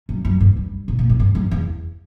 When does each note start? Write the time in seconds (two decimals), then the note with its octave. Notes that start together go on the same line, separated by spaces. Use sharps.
0.09 F#2
0.25 F#2
0.41 G2
0.57 G2
0.88 A#2
0.99 A#2
1.10 A#2
1.20 G2
1.35 F#2
1.51 E2